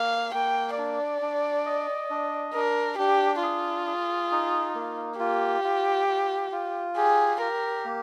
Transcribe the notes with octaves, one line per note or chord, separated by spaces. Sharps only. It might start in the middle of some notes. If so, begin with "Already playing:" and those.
Already playing: A#3 F5
A#3 G5
D4 D5
D4
D#5
D4
D4 A#4
D4 G4
F4 G#4
G#4
D#4
A#3
F4 G4
F4
F4
F4
G4 G#4
G4 A#4
A#3